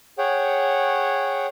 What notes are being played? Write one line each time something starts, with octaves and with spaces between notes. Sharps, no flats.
G#4 C#5 F#5 G5